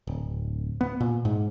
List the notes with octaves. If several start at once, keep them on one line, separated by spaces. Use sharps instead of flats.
D1
B3
A#2
G#2